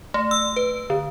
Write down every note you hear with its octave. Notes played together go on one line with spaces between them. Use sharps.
A3
E6
B4
D3